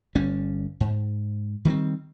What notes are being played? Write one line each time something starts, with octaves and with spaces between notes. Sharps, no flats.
G1 G3 C#4
G#2
D#3 G3 B3 C4